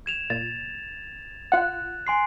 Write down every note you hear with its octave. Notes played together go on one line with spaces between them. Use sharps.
G#6 E7 F7
A#2 A6
F4 F#5 F#6
G#5 C6 C7